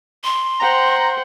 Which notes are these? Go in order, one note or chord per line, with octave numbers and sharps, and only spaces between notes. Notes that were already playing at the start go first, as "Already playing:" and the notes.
C6
C5 F#5 G5 A#5